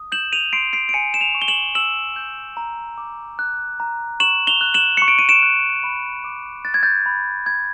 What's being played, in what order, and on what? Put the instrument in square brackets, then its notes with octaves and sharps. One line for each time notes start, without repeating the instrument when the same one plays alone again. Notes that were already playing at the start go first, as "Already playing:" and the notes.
Already playing: [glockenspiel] D#6
G6 E7 F#7
D#7 F7
C6 C7 D7
C7 D7
D7
G#5 C#7 D#7
E7
D#7 F7
C#6
G7
E7 F#7
E6 E7 F#7
G6
A#5
D6
F#6
A#5
C#6 E7 F#7
F7 G7
F#6
E7 F#7
C#6 C#7
D7
D#7
D7 E7
F#6
B5
D6
F#6 A6
G#6
G6 A6
B5
B5 G#6